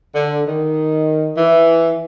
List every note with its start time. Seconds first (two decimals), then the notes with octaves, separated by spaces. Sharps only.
0.15 D3
0.46 D#3
1.37 E3